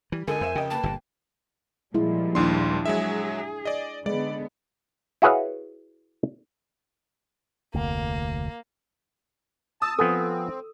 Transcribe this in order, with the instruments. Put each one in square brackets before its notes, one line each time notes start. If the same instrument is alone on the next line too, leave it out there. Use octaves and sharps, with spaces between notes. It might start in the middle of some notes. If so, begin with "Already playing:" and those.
[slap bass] E3 [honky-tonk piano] G3
[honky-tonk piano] C#2 A4 D#5 [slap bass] D3 [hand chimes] A#4 [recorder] G#5
[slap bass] F2 [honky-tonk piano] C5 E5 E7
[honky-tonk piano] F1 G4 D#5 [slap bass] C#3 [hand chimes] G5
[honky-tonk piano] A#3 B4 [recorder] A5
[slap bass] G1 A#2
[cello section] A#2 F3 G3 [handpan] G#3 E4
[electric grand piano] A#1 D#2 C6 [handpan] D4 E4
[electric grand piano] F#3 G#3 E5 [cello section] G#4
[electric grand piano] D5 D#5
[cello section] D3 B3 [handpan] G#3 [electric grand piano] D5
[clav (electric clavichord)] E4 F#4 G#4 B4 C#5 F5
[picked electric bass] F1 D2 [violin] A#3
[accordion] A5 [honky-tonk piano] D#6 E6
[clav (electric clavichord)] F3 B3 G#5 [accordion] C4 [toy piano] A4